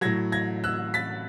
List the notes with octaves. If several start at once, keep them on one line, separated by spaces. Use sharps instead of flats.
A2 F#3 G#6 A#6
G#6 A#6
E6 F#6
A6 B6